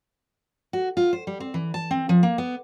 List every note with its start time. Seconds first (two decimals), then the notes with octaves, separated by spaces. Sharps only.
0.73 F#4
0.97 F4
1.13 C5
1.27 G3
1.40 C4
1.54 E3
1.74 A5
1.91 C4
2.09 F3
2.23 A#3
2.38 B3